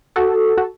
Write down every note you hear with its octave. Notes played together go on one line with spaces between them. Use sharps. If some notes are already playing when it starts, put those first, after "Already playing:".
F#4 A4
F#4